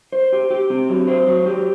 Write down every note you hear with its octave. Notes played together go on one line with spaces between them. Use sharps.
C5
G4
G4
C4
F#3
C5
F#3
G4